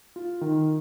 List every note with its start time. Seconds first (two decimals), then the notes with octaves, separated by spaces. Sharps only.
0.16 F4
0.41 D#3